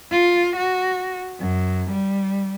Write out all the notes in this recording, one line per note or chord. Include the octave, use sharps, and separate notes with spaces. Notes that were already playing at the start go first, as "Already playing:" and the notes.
F4
F#4
F#2
G3